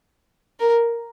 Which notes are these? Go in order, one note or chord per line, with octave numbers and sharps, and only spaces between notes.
A#4